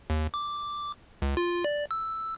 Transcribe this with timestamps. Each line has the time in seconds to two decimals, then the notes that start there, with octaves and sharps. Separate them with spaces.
0.10 D#2
0.34 D6
1.22 C#2
1.37 F4
1.64 D5
1.91 E6